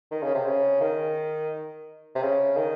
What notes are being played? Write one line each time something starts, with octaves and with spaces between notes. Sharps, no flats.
D#3
C#3
C3
C#3
D#3
C3
C#3
D#3